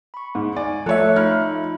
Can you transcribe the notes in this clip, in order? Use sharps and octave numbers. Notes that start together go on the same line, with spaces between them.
B5 C#6
G#2
D5 G#5
F3 A3 A4 C#5 E5 F#6 C#7
D#4 F4 B5 F6